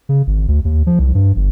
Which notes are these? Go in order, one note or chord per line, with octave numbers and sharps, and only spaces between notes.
C#3
G#1
D2
D#2
F3
C2
G2
G1